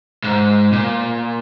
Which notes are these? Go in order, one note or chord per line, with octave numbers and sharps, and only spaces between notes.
G#2
A#2